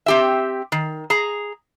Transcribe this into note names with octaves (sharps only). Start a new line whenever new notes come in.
C4 G4 E5
D#3
G#4 A#5